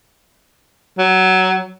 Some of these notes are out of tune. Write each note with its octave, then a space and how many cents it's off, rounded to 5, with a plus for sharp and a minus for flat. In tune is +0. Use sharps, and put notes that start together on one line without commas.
F#3 +15